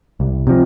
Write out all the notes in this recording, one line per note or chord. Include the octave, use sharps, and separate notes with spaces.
C2
C3 F3